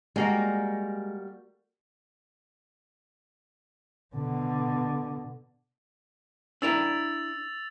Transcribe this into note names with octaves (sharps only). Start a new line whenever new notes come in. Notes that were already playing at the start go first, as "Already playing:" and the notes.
G3 G#3 A#3 F#4
B2 D3
D4 E4 A#4 E6 A6 F7